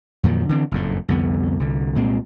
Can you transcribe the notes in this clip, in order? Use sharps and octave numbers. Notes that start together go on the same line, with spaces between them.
F2 A#2 D#3 F#3
D3 E3 C4
F#1 F2 A2
C2 F2 D3 B3
C2 D3
C2 A#2 G#3 C4